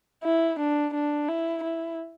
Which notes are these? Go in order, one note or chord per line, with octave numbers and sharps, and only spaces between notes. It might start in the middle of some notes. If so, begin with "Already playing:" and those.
E4
D4
D4
E4
E4